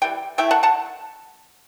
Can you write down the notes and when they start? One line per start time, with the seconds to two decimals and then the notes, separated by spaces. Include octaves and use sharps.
0.02 E3 G3 G5
0.38 E3 A3 E4 E5 G5
0.51 F#5 A5
0.63 F#5 A5